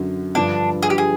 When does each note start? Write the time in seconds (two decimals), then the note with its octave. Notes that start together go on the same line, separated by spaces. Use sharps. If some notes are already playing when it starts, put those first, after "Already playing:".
Already playing: F#2 D3 F#3
0.35 G2 D3 F3 D4
0.83 G#4
0.90 G4
0.98 G#4